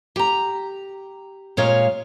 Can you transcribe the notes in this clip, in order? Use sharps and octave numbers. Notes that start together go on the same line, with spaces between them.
G4 A#5
A#2 G#3 C#5 F5